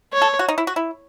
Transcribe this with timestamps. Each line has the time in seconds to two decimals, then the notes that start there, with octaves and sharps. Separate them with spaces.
0.13 C#5
0.22 A4
0.39 F#4
0.48 D#4
0.58 E4
0.67 F#4
0.76 E4